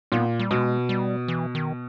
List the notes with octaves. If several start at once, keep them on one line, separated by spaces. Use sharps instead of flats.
A#2 B3
G3
B2 G#3
G3
E3
D#3